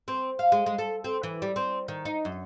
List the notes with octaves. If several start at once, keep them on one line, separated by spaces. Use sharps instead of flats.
C4
F5
G#3
G#3
A4
C4
E3
G3
C4
D#3
D#4
F#2